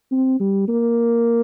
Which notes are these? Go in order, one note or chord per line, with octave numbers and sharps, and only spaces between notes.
C4
G3
A#3